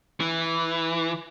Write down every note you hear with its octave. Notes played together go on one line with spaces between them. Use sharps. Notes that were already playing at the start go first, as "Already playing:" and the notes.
E3